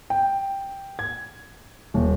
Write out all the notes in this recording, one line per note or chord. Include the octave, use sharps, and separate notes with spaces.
G5
G#6
D#1